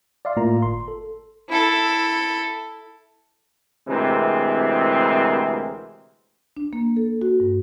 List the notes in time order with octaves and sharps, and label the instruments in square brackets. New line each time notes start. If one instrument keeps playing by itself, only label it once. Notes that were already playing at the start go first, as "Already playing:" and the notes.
[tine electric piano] D5 E5 F5 C6
A2 A3 A#3 F4 D5 A#5
G1 C6
A4
[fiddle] E4 A4
[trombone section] D2 C3 E3 G#3 C4 A#4
[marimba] D4
A#3
A4
F#4
G2